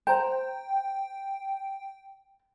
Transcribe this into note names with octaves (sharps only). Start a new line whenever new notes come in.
C5 G5 A#5